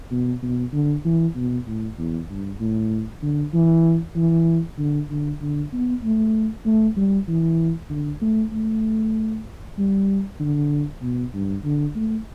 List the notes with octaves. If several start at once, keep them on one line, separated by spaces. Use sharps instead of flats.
B2
B2
D3
E3
B2
A2
E2
G2
A2
D3
E3
E3
D3
D3
D3
B3
A3
A3
G3
E3
D3
A3
A3
G3
D3
B2
G2
D3
A3